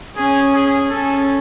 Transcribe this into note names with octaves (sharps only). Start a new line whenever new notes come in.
C#4 G#4
G#4
C#4 A4